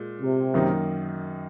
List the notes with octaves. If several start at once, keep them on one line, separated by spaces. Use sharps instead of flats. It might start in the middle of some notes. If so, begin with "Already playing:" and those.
Already playing: A#2 G#3
C3
F#2 D#3 A#3 D#4